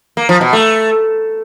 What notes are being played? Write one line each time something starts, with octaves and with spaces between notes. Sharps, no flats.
A#3
F3
B2
A3